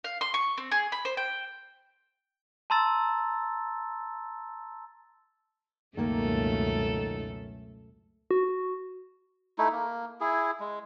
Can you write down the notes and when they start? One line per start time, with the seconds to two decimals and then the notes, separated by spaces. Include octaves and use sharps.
0.04 F5
0.21 C6
0.34 C#6
0.58 C4
0.71 G#4
0.92 B5
1.05 C5
1.17 G5
2.70 A5 A#5 C6 E6 A6
5.97 C#2 F#2 B2 D#3 A3 A#3 A4
8.31 F#4
9.58 A3 D#4 E4
9.72 A#3
10.21 E4 G#4
10.60 G#3